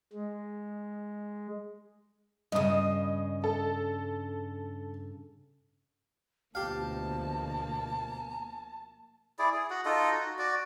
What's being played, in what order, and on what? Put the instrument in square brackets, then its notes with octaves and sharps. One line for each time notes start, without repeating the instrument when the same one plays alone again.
[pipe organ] G#3
[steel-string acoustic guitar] G2 C#3 [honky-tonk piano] D#5 D#6
[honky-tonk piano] A4
[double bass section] D2 B2 F3 [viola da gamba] A#3 [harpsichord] G4 F5 [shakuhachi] A5
[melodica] E4 G#4 D5
G#4
F#4 F#5
D#4 F4 A4 D#5
F#4
F#4 D5